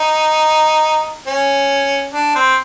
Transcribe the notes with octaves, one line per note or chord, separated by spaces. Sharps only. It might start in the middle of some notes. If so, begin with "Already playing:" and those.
Already playing: D#4
C#4
D4
C4